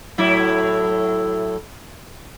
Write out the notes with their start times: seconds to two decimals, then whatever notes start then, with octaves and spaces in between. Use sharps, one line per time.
0.18 A2 F#3 E4